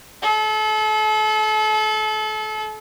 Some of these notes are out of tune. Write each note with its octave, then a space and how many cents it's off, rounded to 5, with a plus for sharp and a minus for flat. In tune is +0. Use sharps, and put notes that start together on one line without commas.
A4 -35